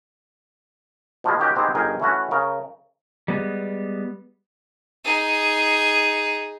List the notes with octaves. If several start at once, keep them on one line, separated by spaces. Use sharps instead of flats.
B2 F3 G3 G#3
D#3 C#4 F#4 G4
B3 C4 D#4 G4 G#4
G1 D#4 G#4 A#4 G5
E3 A3 C#4 F#4
C#3 A#4
G3 G#3 B3
D#4 G#4